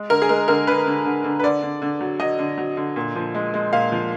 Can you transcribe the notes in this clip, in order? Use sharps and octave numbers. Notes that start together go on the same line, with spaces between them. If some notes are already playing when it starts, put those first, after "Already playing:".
Already playing: G#3
D3 A#4
G#4
G#3 A#4
D3 A#4
D3 B4
D3
D3
D3
B4
D3 D5
D3
D3
F#3
F#3 D#5
D3
F#3
D3
A#2
F3
G#3
G#3
A#2 F5
F3